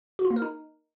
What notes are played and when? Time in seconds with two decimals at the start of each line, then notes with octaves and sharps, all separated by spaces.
0.19 F#4
0.25 F4
0.30 A#3
0.36 A#4
0.42 D#4